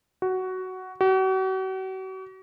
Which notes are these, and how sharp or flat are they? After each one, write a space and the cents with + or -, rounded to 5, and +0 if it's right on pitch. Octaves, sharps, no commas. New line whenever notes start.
F#4 +10
F#4 +40